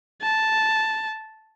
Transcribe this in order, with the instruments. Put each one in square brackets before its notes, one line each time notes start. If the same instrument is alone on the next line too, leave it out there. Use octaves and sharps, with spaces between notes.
[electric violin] A5